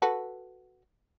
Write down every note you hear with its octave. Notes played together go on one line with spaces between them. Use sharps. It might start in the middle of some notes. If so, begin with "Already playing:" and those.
F#4 A4 B4